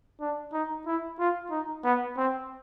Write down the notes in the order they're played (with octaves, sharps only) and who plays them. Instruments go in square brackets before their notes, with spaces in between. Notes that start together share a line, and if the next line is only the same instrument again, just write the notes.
[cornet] D4
D#4
E4
F4
D#4
B3
C4